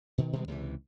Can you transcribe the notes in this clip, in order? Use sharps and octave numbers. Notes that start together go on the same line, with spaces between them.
B2 D#3
B2 D#3 G3 G#3
C#2 C3 D#3 E3